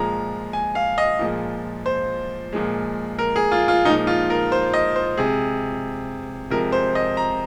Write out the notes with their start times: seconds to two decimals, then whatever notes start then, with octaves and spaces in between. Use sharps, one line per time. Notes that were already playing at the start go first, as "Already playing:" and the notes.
Already playing: A#2 F3 G#3 A#5
0.53 G#5
0.75 F5
0.98 D#5
1.19 A#2 F3 G#3
1.86 C5
2.53 A#2 F3 G#3
3.19 A#4
3.36 G#4
3.52 F4
3.68 F4
3.85 A#2 F3 G#3 D#4
4.07 F4
4.30 A#4
4.52 C5
4.74 D#5
4.96 C5
5.17 C3 G#3 G#4
6.50 C3 F3 G#3 A#4
6.72 C5
6.95 D#5
7.17 A#5